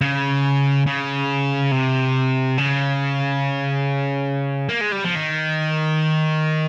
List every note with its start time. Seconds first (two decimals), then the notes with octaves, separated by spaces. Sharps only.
0.01 C#3
0.87 C#3
1.72 C3
2.58 C#3
4.69 A#3
4.81 G#3
4.92 G3
5.04 F3
5.15 D#3